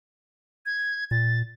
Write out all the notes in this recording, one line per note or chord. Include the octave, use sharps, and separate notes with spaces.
G#6
A#2 A6